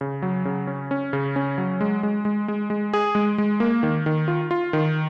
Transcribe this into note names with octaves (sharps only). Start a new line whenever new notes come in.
C#3
F#3
C#3
C#4
C#4
C#3
C#4
F#3
G#3
G#3
G#3
G#3
G#3
G#4
G#3
G#3
A#3
D#3
D#3
F4
F4
D#3